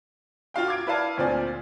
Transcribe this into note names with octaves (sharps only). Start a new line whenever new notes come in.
F4 F#4 F5 G5
D6 G#6 D7
E4 B4 D5 F5 A5
D2 A#2 C4 F4 D5 G#5